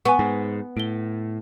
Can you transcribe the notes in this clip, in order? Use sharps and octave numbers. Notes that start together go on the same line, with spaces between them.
B3 G#5 C#6
G#2
A2 D7 G7